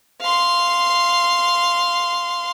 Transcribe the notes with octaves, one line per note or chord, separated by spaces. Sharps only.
F5 C6